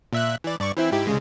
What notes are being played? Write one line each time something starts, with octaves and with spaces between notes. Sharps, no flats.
A#2 E5 F#6
E3 D5
G2 D5 C#6
E3 C4 E4
G#2 E4 G4
C2 C#3 G#3